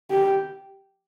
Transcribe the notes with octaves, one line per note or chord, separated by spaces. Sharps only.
G4